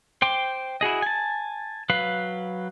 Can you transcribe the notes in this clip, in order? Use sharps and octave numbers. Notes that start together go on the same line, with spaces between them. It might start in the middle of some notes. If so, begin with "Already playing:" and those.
C5 G5 C6 D6
E4 F#4 G#4 D#5
G#5 A5
F#3 B4 F5